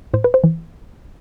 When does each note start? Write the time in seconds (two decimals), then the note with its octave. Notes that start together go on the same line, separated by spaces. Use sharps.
0.14 A2 C5
0.24 B4
0.34 C5
0.44 E3